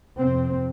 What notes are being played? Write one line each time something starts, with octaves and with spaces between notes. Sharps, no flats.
F2 C3 C4